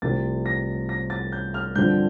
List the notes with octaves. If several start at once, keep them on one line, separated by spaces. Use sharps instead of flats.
C2 C3 F3 A3 C4 A6
A#6
A#6
A6
G6
F6
G2 D3 F3 C4 G6